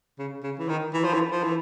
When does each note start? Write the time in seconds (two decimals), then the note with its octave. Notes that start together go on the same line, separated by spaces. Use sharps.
0.19 C#3
0.43 C#3
0.59 E3
0.69 D#3
0.94 E3
1.05 F3
1.14 E3
1.32 F3
1.43 E3